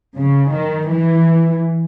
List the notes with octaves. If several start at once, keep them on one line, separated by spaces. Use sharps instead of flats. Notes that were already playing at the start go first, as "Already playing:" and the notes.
C#3
D#3
E3